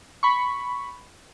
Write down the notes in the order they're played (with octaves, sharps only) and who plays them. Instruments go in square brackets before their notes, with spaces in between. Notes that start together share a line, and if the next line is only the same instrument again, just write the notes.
[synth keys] B5 C#6